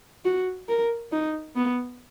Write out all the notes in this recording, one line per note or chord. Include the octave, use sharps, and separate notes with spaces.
F#4
A#4
D#4
B3